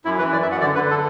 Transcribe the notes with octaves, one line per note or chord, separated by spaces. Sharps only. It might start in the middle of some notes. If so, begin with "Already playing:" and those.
F#2 E4
E3 B4
F#2 D5
E5
F#2 F#5
D3 D5
D3 B4
A4